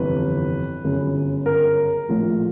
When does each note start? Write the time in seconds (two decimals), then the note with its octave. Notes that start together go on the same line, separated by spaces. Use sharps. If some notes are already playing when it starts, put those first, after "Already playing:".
Already playing: G1 F2 C3 E3 B4
0.84 G1 F#2 C#3
1.46 A#4
2.09 A#1 A2 F3